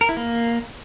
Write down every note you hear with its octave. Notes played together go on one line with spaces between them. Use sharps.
A#4
E4
A#3